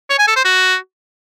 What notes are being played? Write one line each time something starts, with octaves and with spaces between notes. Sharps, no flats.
C#5
G#5
A4
C5
F#4